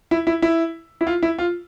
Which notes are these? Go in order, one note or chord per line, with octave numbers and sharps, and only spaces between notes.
E4
E4
E4
E4
F4
E4
F4